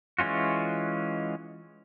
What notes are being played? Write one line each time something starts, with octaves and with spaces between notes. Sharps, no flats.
E3 G#3 C#4 F4 F#4